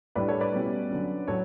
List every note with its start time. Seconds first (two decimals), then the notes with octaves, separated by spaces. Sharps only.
0.15 A2 G3 D4 B4 D5
0.28 A4 C#5
0.40 B4 D5
0.53 B2 G3 C#4 E4
0.91 D3 F#3 C#4
1.28 A2 F#3 A4 C#5